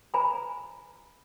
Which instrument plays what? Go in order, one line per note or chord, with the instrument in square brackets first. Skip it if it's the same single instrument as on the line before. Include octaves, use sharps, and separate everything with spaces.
[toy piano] B4 G#5 A#5 B5